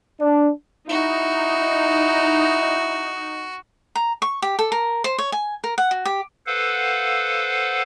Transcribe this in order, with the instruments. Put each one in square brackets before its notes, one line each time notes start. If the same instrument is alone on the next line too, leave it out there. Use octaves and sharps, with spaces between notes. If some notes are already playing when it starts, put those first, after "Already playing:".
[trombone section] D4
[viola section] D#4 [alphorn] E4 [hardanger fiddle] F#4
[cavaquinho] A#5
C#6
G4
A4
A#4
C5
C#5
G#5
A#4
F#5
F#4
G4
[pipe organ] A4 B4 C5 F5 F#5